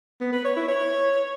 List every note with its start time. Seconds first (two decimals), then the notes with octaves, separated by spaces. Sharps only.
0.21 B3
0.33 B4
0.45 C#5
0.57 E4
0.68 C#5